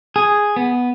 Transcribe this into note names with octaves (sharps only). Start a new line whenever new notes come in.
G#4
B3